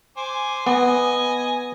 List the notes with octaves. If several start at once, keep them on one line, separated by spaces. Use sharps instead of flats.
C5 G#5 D6
B3 D#5 G#5